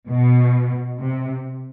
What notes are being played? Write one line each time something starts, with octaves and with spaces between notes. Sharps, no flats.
B2
C3